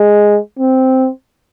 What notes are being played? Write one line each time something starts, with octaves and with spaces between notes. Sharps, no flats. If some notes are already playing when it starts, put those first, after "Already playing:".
Already playing: G#3
C4